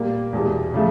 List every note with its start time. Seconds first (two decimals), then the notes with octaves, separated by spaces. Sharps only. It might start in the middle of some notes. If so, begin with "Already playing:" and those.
Already playing: A#2 G3 A#3
0.33 E2 B2 G3
0.74 C#3 F3 A3